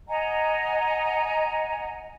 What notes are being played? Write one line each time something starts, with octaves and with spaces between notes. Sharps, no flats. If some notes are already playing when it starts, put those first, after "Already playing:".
D#5 F#5 G#5 A#5